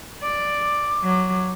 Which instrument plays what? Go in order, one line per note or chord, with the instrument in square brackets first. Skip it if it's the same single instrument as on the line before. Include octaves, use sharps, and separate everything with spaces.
[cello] D5 [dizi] D6
[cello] F#3